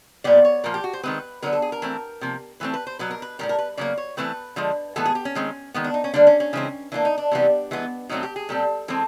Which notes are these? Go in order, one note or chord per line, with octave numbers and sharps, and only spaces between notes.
A#2 G3 B3 D5
C#5
A#2 F3 A#3 A#4
G4
F#4
C5
D#3 G#3 C4 B4
D3 F#3 B3 A#4
A4
G#4
A#4
E3 A3 C4
C3 F3 A#3
E3 A3 C4 B4
B4
C5
B2 F#3 B3 B4
A#4
B4
A2 E3 G3 A#4
A#4
B4
C#3 F#3 A#3 D5
C#5
E3 A3 C4 B4
D3 F3 G#3
A2 E3 G#3 B3 A4
G#4
G4
C#4
D#3 G#3 C4
D#3 G#3 B3
D4
D#4
C#4
D3 G3 A#3 D4
C#4
C#4
C#3 E3 G#3 C4
E3 G3 A#3 D4
D#4
D4
C3 E3 G3 B3
E3 G#3 B3
B2 F#3 A3 C4 D#4
G4
G#4
A#2 G3 C4 A4
E3 G#3 C4 A4